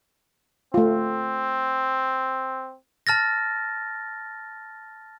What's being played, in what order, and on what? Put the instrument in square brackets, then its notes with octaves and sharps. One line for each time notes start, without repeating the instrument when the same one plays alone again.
[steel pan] A3 F4 [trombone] C4
[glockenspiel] A5 F6 A6 A#6